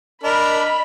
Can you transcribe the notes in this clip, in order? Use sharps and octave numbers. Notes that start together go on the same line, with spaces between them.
D4 A#4 D#5 B5